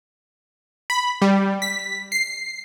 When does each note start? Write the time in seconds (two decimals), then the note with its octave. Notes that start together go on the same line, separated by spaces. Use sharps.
0.90 B5
1.22 G3
1.62 B6
2.12 C7